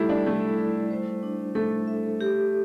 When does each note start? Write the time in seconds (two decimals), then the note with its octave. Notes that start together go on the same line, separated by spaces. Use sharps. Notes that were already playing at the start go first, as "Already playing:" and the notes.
Already playing: G3 A3 E4 G4 A4
0.09 D4
0.26 A3 E4
0.58 G3
0.91 C5
1.23 D4
1.55 A3 A4
1.88 E5
2.21 G4